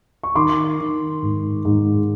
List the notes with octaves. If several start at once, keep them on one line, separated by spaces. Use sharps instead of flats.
C#6
D#3 C6 D6
D#3
G#2
G#2